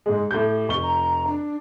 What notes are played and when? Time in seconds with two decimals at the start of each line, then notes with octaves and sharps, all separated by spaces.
0.06 G#2 G#3
0.31 A2 G4 G6
0.68 F1 C#6 G7
0.83 A#5
1.27 D4